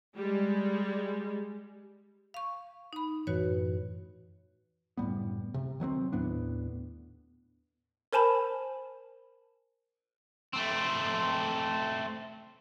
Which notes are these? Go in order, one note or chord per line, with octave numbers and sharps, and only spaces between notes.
G3 G#3
F5 C#6
D#4 B5
F#2 A2 E3 F#4 B4 C#5
F#1 A2 G3 B3
C3
D#3 F#3 A3 C4
D#2 A2 B3 D4
A#4 C5 G#5 A5 B5
A3 C4